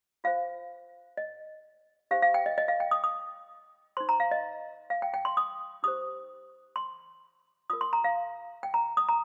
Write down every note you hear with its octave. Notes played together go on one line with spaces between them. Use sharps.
F4 C5 F5
D#5
D#4 G4 C5 F5
F5
G5
D#5
D#5
F5
G5
D#6
D#6
D#4 C5 C6
A#5
F5
D#5
F5
G5
G5
C6
D#6
D#4 G4 C5 D#6
C6
F4 A#4 D#6
C6
A#5
F5
G5
A#5
D#6
A#5